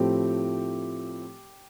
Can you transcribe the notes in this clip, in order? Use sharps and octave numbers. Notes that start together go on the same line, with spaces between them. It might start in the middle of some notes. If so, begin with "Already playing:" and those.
Already playing: A2 F3 A3 C4 G4